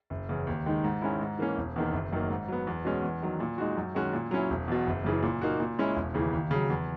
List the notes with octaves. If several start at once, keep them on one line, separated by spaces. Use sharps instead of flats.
F#1
E2 C#3
D#2
D#3 G#3 D#4
G#2
D#3 G#3 C#4 E4
G#2
E3 A#3 C#4
E1
E2 D#3 A#3
F#1
F#2 D#3 A#3
G#2
F#3 B3
E2
B2 G#3 C#4
E2
D#3 F#3
A#2
G#3 D#4 F#4
F#2
D#3 G#3 C#4 F#4
A#2
F#3 C#4 E4
E1
E2 B2
F#1
F#2 C#3 E3
A#2
A#3 D#4 F#4
A#2
G#3 C#4 E4
E1
D#2 C#3 E3
D#2
C#3 F#3
E2